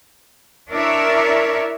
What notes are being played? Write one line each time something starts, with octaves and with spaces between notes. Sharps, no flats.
D4 E4 A#4 C#5 D5 E5